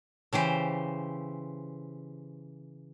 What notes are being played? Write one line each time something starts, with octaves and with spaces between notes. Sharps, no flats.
C#3 E3 G4 C5